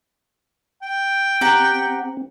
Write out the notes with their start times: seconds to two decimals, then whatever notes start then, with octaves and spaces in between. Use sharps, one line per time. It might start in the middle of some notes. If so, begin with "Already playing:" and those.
0.83 G5
1.41 C4 G4 F#5 A#5